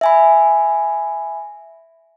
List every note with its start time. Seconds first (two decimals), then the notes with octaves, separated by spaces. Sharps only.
0.01 E5 G#5 B5